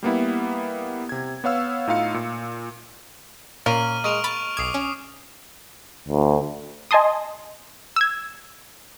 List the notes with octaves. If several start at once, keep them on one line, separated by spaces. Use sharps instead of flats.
G3 A#3 B3 E4
C3 G#6
B3 C#5 F5 E6
A2 D#4 F4 F5 C#7
A#2
A#2 A#3 C#4 F6 D#7 F#7
G#3 C#6 D7 F7
A5 B5
B1 D6 D#6 G#6 C7
C#4
D2
D#5 G#5 A5 C6 D#6
E6 G#6